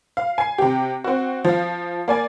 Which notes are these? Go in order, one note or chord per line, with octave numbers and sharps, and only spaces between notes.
F5
G#5 C7
C3 G4
C4 F#4
F3 F5
A#3 D5 G#5